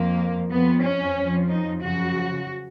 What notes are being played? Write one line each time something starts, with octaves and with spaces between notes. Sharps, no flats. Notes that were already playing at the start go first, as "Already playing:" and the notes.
Already playing: F2 F3 A#3
F2 F3 B3
C#4
F2 F3
D#4
F#2 C#3 F3 F#4